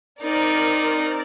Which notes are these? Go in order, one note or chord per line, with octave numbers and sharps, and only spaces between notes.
C4 D#4 A#4 D5